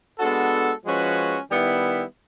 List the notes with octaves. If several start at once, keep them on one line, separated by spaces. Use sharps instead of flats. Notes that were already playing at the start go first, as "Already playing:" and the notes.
G#3 B3 D4 F#4 A4
F3 G#3 C#4 F#4 B4
D#3 G3 B3 E4